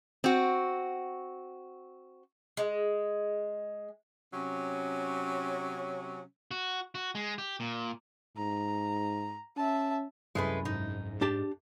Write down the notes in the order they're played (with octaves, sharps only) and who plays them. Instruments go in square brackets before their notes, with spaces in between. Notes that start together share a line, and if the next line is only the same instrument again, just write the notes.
[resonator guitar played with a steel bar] C4 F#4
[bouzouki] G#3
[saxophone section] C3 F#3 C#4
[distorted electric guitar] F#4
F#4
G#3
G4
A#2
[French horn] G#2 [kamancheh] A#5
[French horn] C#4 [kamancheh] E5 A5
[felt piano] C2 F#2 G#5 [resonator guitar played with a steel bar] G#3 A3 B4
[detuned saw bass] G#2 [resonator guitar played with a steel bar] D#4
[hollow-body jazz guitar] D4 G4 A5